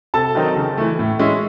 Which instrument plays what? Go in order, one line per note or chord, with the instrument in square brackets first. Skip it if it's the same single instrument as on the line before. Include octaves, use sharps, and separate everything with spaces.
[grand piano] C3 A4 A5
D#3 F#3 C4 D#4
C#3
E3 A3
A2
G#3 C#4 E4